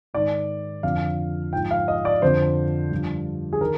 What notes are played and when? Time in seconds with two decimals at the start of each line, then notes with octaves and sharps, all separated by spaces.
0.14 G#2 D#3 D5
0.83 F2 D3 F3 F5
1.53 G#2 F3 G5
1.71 F5
1.88 D#5
2.05 D5
2.22 F2 D3 F3 C5
2.91 G2 D3 F3
3.53 G#4
3.61 D#3 A#4